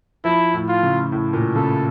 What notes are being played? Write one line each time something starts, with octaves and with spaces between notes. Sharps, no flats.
F3 E4
A2
F4
C#3
A2
A#2
C#3 A4